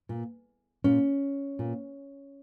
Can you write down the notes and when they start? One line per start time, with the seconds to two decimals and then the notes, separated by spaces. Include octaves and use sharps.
0.09 A#2
0.84 A#2 C#4
1.59 A#2